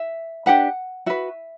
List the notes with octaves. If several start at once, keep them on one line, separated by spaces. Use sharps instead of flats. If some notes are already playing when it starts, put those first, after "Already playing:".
Already playing: E5
D4 G4 B4 F#5
F#4 B4 E5